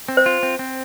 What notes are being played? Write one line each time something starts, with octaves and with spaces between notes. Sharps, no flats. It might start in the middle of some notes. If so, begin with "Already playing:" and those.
C4
C5
F4
C4
C4